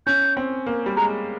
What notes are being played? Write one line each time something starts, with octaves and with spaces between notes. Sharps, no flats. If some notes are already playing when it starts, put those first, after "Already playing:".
C#4 G6
C4
A#3
G3
G#3 A#5